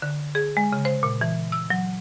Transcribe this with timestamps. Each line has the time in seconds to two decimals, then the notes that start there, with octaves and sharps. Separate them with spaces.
0.02 D3
0.35 G#4
0.57 G#3
0.73 C#3
0.85 C5
1.03 A#2
1.21 E3
1.52 E6
1.70 F#3